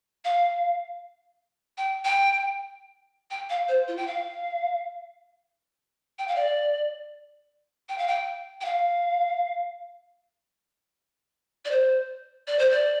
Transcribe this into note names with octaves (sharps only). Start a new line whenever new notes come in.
F5
G5
G5
G5
F5
C5
F4
G5
F5
G5
F5
D5
G5
F5
G5
G5
F5
D5
C5
D5
C5
D5